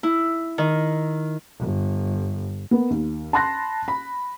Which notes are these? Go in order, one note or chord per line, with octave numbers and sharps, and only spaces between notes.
E4
D#3
G1
B3 A#4
D#2
A5 B5 C6 F#6 A#6
B5